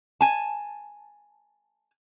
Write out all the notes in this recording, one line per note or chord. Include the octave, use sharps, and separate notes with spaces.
G#5 A5